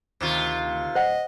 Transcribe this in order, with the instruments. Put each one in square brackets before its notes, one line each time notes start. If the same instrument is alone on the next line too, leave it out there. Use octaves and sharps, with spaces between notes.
[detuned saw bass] D2 [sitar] C3 D#3 F4
[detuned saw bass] D1 [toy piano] C5 F#5 [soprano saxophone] D#5